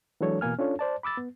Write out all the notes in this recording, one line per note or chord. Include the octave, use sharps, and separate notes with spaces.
E3 F#3 G#3 D4 A4 C#5
B2 E3 A#3 G#5 F6
C#4 D4 F4 A4 C#5
C5 D5 A5
B5 D6 E6 A6
B3